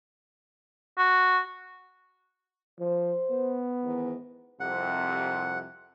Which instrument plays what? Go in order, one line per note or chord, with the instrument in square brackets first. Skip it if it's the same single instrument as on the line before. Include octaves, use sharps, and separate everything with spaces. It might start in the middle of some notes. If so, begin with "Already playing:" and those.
[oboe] F#4
[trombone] F3 [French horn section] C5
[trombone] B3
[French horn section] G#2 D#3 E3
[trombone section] C2 F2 C3 [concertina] F#5